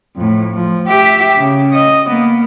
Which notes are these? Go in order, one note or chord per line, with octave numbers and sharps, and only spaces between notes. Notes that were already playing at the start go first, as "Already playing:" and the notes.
F2 A2
F3
G4 E5
C#3
D#5
A#3 B3